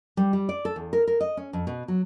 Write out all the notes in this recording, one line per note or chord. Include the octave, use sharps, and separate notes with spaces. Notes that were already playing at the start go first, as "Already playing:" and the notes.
G3
G3
D5
A4
E2
A#4
A#4
D#5
C#4
F2
B2
F#3